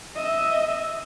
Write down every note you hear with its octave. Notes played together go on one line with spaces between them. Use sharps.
D#5 E5